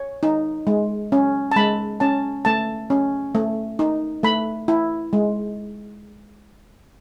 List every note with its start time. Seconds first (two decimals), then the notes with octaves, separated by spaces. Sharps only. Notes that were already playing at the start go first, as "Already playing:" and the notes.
Already playing: C#5
0.23 D#4
0.67 G#3
1.12 C#4
1.52 A5
1.56 G#3 B5
2.00 C#4 A5
2.45 A3 A5
2.90 C#4
3.35 A3
3.79 D#4
4.23 A3 B5
4.68 E4
5.13 G#3